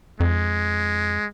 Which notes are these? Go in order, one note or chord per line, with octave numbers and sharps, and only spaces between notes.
F2 G#3